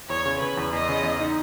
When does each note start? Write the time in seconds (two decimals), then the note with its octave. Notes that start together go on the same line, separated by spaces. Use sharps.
0.09 E2 C#5
0.26 C#3
0.40 C#3 B4
0.57 E2
0.72 E2 D#5
0.89 C#3
1.03 E2
1.20 D#4